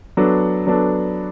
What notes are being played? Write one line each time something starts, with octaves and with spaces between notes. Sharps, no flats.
F#3 B3 D4 A4
F#3 B3 D4 A4